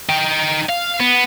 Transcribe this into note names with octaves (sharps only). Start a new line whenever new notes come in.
D#4 G5
F5
B3